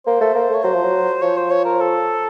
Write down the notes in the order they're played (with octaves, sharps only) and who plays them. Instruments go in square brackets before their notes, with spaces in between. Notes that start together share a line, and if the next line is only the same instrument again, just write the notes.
[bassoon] A#3 [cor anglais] C5
[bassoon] A3
A#3
[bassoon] A3 [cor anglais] C#5
[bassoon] F#3 [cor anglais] C5
[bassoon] F3
F#3
[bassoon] F3 [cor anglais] C#5
[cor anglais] C5
C#5
A#4
A4